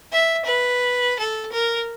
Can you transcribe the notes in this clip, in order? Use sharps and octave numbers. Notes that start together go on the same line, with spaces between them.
E5
B4
A4
A#4